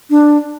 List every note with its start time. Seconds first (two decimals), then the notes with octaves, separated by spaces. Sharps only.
0.10 D4